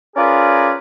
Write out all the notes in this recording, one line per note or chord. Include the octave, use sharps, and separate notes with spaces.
C#4 F4 G#4 A#4 B4 D5